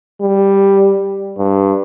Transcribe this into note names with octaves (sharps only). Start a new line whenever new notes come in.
G3
G2